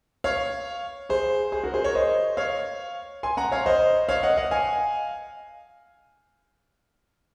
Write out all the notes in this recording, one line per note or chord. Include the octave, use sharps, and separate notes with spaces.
C#5 F5
G#4 C5
G#4 C5
F#4 A#4
G#4 C5
A#4 C#5
C5 D#5
C#5 F5
G#5 C6
F#5 A#5
C#5 F5
C5 D#5
C#5 F5
D#5 F#5
D#5 F#5
F5 G#5